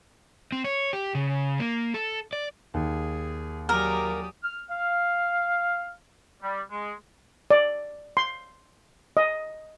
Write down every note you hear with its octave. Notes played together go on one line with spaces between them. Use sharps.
C4
C#5
G4
C#3
A#3
A4
D5
D#2 G#4
F#3 G4 G#4 A#4 D5 D#6
F6
F5
G3
G#3
D5
C6
D#5